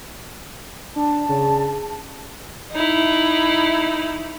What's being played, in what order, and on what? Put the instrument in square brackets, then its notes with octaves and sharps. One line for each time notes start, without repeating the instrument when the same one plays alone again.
[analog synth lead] D4 [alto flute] A5
[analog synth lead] C#3
[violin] D#4 E4